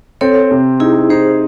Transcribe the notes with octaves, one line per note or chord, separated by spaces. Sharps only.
C4 A4 C#5
C3
D#4 E4 G#4
D#4 G#4 C5